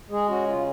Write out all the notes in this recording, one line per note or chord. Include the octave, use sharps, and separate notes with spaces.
G#3 G#4
C#4 F#4
C#3 F4